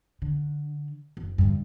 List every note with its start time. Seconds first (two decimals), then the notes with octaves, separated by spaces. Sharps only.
0.22 D3
1.17 F#1
1.38 G2 D3